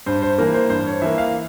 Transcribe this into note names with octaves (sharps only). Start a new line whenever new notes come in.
G2 C5
C5
E3 A#3 A#4
C5
G2 C5
C#5
E3 A#3 E5
F5